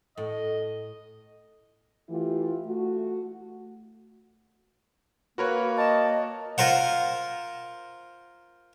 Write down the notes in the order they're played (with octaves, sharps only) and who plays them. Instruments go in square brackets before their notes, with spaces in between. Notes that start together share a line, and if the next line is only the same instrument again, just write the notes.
[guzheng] A2 [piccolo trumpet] D#5
[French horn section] E3 A3 E4 F4 G4
A3 F#4
[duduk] A#3 [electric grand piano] F#4 A#4 C#5 [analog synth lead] B4
[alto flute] D#5 [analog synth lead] A5
[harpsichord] F4 A#4 C5 F#5